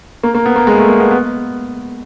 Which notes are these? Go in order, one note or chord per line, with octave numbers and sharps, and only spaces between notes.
A#3
A#3
B3
A#3
G#3
A3
A#3
B3
B3